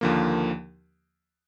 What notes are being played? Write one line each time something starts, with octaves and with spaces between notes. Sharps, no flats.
D#2 D3 F3 A#3